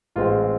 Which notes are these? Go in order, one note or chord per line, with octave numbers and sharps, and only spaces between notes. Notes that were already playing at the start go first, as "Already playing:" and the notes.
A1 G#2 G#3 C4 F4